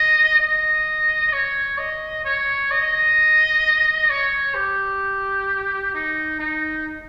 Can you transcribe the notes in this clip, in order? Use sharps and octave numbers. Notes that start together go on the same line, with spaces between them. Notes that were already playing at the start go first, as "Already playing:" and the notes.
Already playing: D#5
D#5
C#5
D#5
C#5
D#5
C#5
G4
D#4
D#4